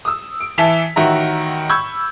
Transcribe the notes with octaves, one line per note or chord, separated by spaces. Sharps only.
D#6 E6
D7
E3 E4 A5 B6 F7
A1 D#3 F#4 E5 A#5
B5 C#6 E6 G6 G#6